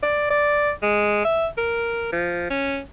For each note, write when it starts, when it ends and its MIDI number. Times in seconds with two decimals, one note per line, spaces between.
0.03 0.29 74
0.30 0.71 74
0.82 1.25 56
1.25 1.47 76
1.58 2.12 70
2.12 2.50 53
2.50 2.78 61